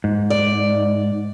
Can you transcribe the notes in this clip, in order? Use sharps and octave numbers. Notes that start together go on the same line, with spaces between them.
G#2
D5